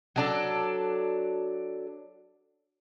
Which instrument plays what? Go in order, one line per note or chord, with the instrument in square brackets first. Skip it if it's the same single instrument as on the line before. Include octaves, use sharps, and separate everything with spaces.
[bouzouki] F#3 D4 A4